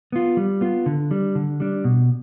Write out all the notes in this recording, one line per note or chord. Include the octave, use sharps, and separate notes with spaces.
B3 F4
G3
B3 F4
D3
G3 D4
D3
G3 D4
B2